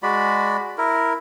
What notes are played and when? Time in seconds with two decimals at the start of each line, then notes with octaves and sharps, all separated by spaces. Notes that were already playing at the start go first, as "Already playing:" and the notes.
0.03 G#3 F#4 D5 B5
0.78 E4 A#4